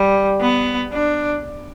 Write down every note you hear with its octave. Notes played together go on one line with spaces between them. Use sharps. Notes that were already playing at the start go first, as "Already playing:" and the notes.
Already playing: G3
B3
D4